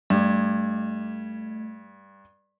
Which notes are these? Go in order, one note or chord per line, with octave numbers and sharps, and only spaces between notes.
G2 A3 G#6